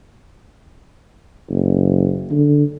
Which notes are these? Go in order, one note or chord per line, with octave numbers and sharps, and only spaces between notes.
F#1
D3